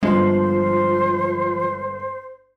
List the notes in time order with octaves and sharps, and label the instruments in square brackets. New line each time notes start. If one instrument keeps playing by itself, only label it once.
[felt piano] G1 [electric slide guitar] F3 [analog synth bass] G#3 [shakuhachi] C5